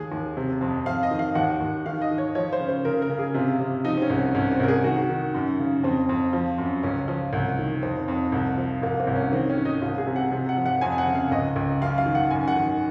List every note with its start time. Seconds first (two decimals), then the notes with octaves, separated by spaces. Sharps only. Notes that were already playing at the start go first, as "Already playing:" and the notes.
Already playing: D#2 G#4
0.12 D#2
0.37 C3
0.61 F2
0.86 F2 F5
1.03 D#5
1.11 D#3
1.19 F5
1.35 D#2 F#5
1.61 D#2
1.86 D#3 F5
2.02 D#5
2.11 D#3
2.18 C#5
2.35 F3 C#5
2.53 C5
2.60 C#3
2.69 C5
2.85 C#3 A#4
3.02 A#4
3.09 C#3
3.19 G#4
3.34 C3 F4
3.60 C3
3.85 F3 D#4
3.97 C4
4.02 C#4
4.10 C2
4.18 C4
4.35 C2 C#4
4.52 C4
4.60 C2 A#4
4.68 G#4
4.84 D#3 F#4
5.09 D#3
5.34 F#2
5.59 C#3
5.84 F2 C4
6.09 F2
6.33 F3
6.58 F#2
6.83 C#2 C#4
7.08 F3
7.33 C2
7.59 D#3
7.83 F2 C4
8.08 F2
8.32 C2
8.57 F3
8.82 C2 A#3
9.00 C4
9.07 C2
9.16 C#4
9.32 D#3 C4
9.49 C#4
9.57 D#3
9.65 D#4
9.82 C2 F4
9.98 G#4
10.06 C3
10.16 F#5
10.32 C3
10.49 F#5
10.57 F3
10.66 F#5
10.81 F2 G#5
10.98 F#5
11.07 C#3
11.15 F5
11.31 C#2 D#5
11.56 C#2
11.81 F#2 F5
11.98 F5
12.06 D#3
12.15 F#5
12.30 F#2 G#5
12.48 F#5
12.56 D#3